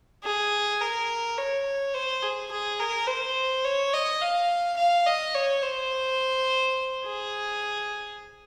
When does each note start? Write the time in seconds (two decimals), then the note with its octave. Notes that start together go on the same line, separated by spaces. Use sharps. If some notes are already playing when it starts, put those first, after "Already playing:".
0.24 G#4
0.81 A#4
1.38 C#5
1.94 C5
2.22 G#4
2.51 G#4
2.80 A#4
3.07 C5
3.64 C#5
3.93 D#5
4.21 F5
4.77 F5
5.07 D#5
5.35 C#5
5.62 C5
7.05 G#4